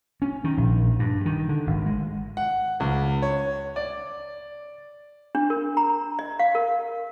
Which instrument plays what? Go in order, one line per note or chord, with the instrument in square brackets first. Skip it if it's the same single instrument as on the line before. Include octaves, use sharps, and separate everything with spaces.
[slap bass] C#4
D#3
A#1
G2
D#3
D3
G#1
G#3
[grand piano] F#5
C#2
C#5
D5
[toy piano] D4
A#4
A#5
D#5
F5
A#4